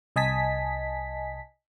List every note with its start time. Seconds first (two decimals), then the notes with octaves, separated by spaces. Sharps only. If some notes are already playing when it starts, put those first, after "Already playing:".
0.16 C2 D#5 G#5 A5 B6